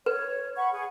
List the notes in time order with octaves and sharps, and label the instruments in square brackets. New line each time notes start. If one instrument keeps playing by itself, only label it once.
[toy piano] B4 [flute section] C#5
[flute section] F#5 B5 C#6
G#4 F#5